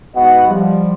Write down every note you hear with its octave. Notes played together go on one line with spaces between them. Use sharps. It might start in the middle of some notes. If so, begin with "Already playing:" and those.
G#2 B3 F#4 D#5 F#5
F3 G3